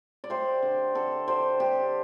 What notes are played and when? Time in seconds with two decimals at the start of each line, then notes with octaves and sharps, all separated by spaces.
0.24 D5
0.30 A3 G4 C5
0.62 D3
0.95 D3 A4
1.27 D3 G4 C5
1.60 D4 G4